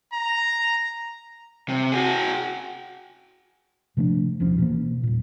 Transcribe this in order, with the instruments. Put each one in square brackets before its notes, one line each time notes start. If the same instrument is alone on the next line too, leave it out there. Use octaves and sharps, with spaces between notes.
[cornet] A#5
[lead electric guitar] C3
F#4 G#4
[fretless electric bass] C3 F3 A3 D4
D#1 B1 F3 C#4
B2 E3 A#3
D#1 A#2